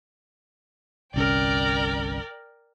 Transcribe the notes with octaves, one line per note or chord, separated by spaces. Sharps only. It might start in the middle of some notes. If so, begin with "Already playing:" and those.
G1 C2 C#4 A#4 D5 G5